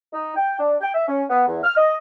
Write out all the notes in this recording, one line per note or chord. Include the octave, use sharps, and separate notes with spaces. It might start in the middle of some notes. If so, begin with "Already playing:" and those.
D#4
G5
D4
G5
E5
C#4
B3
E2
F6
D#5